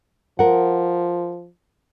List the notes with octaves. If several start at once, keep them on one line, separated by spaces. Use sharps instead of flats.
F3 A#4 F#5